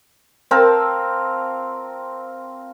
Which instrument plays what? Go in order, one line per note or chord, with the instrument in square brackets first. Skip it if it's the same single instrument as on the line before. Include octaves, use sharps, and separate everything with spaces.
[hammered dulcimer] C4 F4 A#4 A5